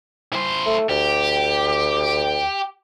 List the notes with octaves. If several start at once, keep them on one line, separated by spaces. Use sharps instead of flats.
E4 C5
A3
D2 G4